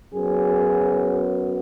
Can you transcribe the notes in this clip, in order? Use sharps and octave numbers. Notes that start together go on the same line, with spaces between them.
F#2 F#3 B3 G#4